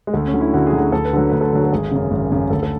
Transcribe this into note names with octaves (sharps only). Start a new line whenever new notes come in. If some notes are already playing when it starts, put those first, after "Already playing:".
G#3
D2 A3
C#4
D3 F#3
E4
D2 F#4
G#4
D3 F#3
G#4
D2 A4
B4
D3 F#3 A4
D2 B4
A4
D3 F#3
A4
G#1 G#4
F#2 C#3
G#1
F#2 C#3
D2 A4
A4